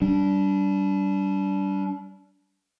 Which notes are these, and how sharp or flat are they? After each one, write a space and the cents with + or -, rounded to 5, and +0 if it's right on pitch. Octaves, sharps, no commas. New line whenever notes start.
G3 -20 D4 -25